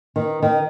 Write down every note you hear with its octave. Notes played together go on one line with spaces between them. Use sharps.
D#3
D#3